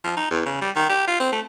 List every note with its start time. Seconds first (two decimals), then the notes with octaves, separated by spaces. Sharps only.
0.04 F3
0.17 D#4
0.31 E2
0.46 C#3
0.61 G3
0.76 D#3
0.89 G4
1.07 F4
1.20 C4
1.32 A3